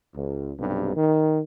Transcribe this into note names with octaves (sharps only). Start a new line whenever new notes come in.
C#2
B1 G2 C3
D#3